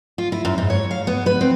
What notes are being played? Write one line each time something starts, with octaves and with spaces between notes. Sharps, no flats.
F4
E4
F#2
G#2
C#5
F5
B3
B4
C4